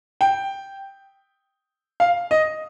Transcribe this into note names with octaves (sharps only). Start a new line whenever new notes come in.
G5
F5
D#5